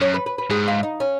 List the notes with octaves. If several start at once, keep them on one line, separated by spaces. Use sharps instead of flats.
F#2 C#5
B4
B4
B4
G#2 G#4
F4
D#4
C#4